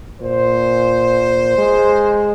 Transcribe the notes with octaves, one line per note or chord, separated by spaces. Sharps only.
A#2 C5
G#3